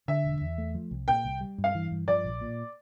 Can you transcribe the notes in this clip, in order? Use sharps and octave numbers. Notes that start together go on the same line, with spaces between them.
D3 E5
E1
E2
A3
F3
C2
A#2 G5
C2
G3
G2
F5
E3
G2
F3 D5
A#1
A#2